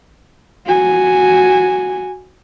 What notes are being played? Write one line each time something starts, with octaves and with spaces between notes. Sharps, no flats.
F#4 G#5